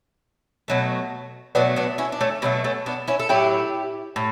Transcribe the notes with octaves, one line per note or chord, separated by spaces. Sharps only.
B2 F#3 A3
B2 F#3 A3 B3 D4
B3 D4
C#4 E4
D4
A3 C#4
B2 F#3 A3 B3
A3 C#4
B3 D4
C#4 E4
A4
A2 F#3 A3 E4 G4
A2